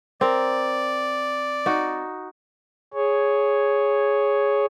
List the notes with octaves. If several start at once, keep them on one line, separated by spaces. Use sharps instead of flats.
C4 A#4 D5
D#4 F#4
G#4 C#5